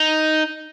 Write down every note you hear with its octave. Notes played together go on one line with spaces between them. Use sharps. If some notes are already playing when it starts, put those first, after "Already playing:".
Already playing: D#4